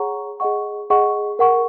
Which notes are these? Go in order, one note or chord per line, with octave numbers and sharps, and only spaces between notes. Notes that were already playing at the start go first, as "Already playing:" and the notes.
Already playing: G#4 C#5 F#5 A#5 C#6
G#4 D#5 F#5 C#6
G#4 D#5 F#5 C#6
A#4 F#5 C#6